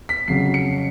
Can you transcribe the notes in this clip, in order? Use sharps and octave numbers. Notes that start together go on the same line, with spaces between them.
B6
F2 C#3 F#3 C7
C#7